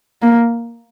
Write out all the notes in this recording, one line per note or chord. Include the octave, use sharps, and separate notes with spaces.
A#3